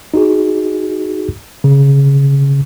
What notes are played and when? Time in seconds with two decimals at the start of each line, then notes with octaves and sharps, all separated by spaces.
0.14 D#4 F#4 G#4
1.64 C#3